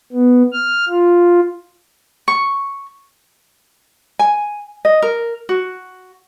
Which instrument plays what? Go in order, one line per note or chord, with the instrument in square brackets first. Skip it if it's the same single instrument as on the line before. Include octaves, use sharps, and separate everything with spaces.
[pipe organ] B3
F6
F4
[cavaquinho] C#6
[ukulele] G#5
D#5
A#4
F#4